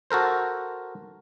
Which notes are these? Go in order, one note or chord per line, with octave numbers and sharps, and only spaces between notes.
F#4 A4 A#4 C5